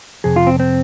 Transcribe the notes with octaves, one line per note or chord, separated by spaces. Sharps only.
F2 C3 G#4
F4
C4
C4